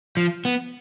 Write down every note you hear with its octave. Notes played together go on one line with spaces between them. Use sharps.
F3
B3